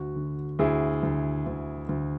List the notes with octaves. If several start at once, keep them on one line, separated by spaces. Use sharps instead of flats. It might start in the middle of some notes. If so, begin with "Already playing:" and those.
Already playing: D2 F#4
D3
D2 E4 G#4
D2
D2
D2